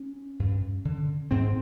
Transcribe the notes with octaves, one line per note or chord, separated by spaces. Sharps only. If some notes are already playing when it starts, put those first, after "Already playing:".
Already playing: C#4
G2
D3
G#2 C4